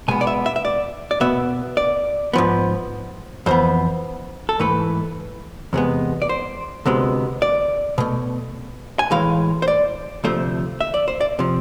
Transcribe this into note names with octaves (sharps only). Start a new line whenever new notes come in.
B2 G#3 B3 G#5
D5
E5
E5
E5
D5
D5
B2 B3 E5
D5
G#2 F3 B3
F2 E3 B3 C5
A4
G#2 E3 A3 B4
E2 C3 G#3 B3
D5
C5
D2 C3 G#3 B3
D5
B2 A3
G#5
A2 E3 G#3 F5
C5
D5
D2 C3 F3 A3 C5
E5
D5
C5
D5
C3 F3